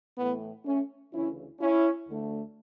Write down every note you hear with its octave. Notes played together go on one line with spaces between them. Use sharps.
A2 E3 A3 B3
A3 C#4
D2 C#3 E3 C#4 E4
C#4 E4
D2 D3 A3